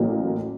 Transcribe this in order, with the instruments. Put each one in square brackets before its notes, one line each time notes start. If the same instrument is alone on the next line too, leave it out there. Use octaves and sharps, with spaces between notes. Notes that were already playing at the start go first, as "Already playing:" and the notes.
Already playing: [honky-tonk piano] A1 A2 F#3 A#3